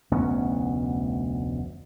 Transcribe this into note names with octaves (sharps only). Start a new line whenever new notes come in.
F1 D2 B3 C#4